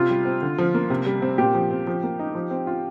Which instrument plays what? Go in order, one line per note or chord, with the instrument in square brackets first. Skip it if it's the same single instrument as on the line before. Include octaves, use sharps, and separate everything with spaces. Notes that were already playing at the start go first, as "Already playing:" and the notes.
Already playing: [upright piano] C3 [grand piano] F4
[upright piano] G3
C4
D3
F3
A#3
C3
G3
C4
[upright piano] A#2 [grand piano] G4
[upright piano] F3
C4
F3
A#3
D#4
F3
C4
F4